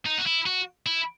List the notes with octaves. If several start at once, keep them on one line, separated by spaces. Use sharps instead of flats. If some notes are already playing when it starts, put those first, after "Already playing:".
D#4
F#4
E4
F#4
E4